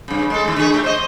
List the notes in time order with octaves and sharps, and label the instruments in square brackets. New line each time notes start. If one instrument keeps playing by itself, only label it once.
[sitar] G2 C#3
G#3 A4
D#3 A3
D3 G#4
C#3 A3 G4
C5 D#5